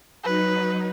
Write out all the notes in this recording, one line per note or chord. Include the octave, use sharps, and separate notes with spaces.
F#3 D#4 B4